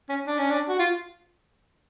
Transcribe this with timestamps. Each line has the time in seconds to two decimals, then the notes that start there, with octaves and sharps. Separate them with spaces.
0.09 C#4
0.27 D4
0.38 C#4
0.50 D4
0.68 F#4
0.79 F4